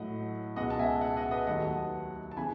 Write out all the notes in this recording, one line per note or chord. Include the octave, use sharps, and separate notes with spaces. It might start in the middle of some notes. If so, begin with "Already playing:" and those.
Already playing: A2 F#3 A3 D#5 F#5
C#2 B2 G#3 D#5 F#5
A5
E5 G#5
F#5 A5
D#5 F#5
B4 D#5
D#2 D#3 F#3 A3 F#5 A5
A5
C#3 E3 G#5 B5